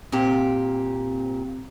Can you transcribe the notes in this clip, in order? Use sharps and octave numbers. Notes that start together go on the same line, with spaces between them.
A#2 C4 G4